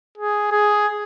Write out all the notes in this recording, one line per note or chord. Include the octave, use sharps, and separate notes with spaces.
G#4
G#4